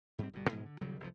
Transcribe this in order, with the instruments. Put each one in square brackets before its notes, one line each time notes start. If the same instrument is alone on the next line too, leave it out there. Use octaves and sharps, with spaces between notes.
[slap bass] G#2 G3 C4
G1 B2 G3
G#2 B2 F3 G#3
D3
D#1 C#3 F#3 G3
F1 C2 A#2 F3